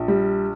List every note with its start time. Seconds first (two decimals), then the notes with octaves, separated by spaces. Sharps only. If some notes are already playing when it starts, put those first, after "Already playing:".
Already playing: A#1
0.08 G3